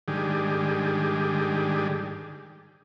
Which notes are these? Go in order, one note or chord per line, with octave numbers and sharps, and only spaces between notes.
G#2 D3 D#3 G3 G4 G#4